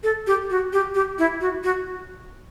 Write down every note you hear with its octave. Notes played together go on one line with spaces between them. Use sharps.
A4
G4
F#4
G4
G4
E4
F#4
F#4